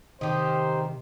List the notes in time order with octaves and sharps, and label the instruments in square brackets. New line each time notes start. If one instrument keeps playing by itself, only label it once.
[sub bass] C3 [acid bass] D#3 [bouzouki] G4 D#5 [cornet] C5